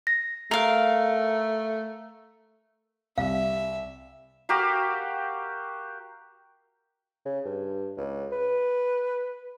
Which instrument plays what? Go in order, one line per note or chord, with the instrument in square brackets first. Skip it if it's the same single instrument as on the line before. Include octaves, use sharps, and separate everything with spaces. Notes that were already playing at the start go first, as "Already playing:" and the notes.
[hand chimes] A#6
[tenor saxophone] A3 [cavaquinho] A#4 F5
[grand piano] C2 [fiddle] E5 [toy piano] F5
[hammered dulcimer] F#4 G4 A#4 F5
[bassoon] C#3
G2
C#2
B4